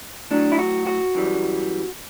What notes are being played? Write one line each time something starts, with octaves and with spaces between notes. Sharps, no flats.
A2 F#3 D4
E4
F#4
F#4
F#2 E3 G3